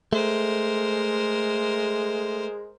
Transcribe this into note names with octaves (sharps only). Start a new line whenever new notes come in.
G#3 A3 A#4 C5